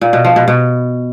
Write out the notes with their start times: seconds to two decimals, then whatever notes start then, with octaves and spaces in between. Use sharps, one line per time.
0.01 A#2
0.13 B2
0.25 F3
0.36 B2
0.48 B2